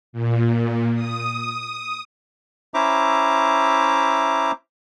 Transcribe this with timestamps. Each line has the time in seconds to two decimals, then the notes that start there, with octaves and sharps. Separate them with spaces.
0.13 A#2
0.95 D#6
2.74 C#4 E4 C5 E5 A#5 D6